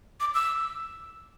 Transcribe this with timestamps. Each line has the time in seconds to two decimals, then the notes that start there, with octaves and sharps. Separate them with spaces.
0.20 D6
0.35 E6